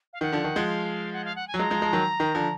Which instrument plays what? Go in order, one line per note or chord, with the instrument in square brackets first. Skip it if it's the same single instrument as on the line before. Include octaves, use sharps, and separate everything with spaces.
[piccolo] F5
[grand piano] D#3 [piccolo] F#5
[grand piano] D3 F3
D#3
F3 G#3
[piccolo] F5
F#5
F5
F#5
G#5
[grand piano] F#3
[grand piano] F3 G#3 [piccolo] A#5
[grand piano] F3 G#3
F3 G#3
D#3 F#3
D#3
D3 F3